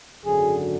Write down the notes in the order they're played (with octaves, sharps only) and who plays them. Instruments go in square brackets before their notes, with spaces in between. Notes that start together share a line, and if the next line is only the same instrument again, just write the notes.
[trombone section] G#1 F#2 D3 F#3 G#4